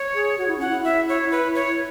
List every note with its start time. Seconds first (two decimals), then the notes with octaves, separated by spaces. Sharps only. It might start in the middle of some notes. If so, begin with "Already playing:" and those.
Already playing: C#5
0.14 G#4
0.38 F#4
0.48 E4
0.58 C#4 F#5
0.68 E4
0.84 E5
1.09 C#5
1.31 B4
1.55 C#5